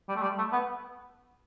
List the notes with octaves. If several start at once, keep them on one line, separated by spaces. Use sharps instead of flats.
G3
A3
G3
A3
B3